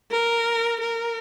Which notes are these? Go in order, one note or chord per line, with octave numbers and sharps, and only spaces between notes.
A#4
A#4